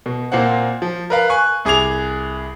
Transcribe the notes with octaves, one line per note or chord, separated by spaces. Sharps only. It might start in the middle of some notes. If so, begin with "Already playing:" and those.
B2
A#2 A#3 C4 F#5
F3
A#4 B4 F5
G#5 C#6 F#6
C2 G#4 D6 G#6 F7